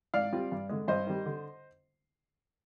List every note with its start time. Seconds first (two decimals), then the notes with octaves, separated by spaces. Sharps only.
0.14 G#2 D5 F5
0.32 G3 C4 F4
0.52 G2
0.69 D3 G#3
0.88 G2 C5 D#5
1.07 D#3 G3
1.26 D3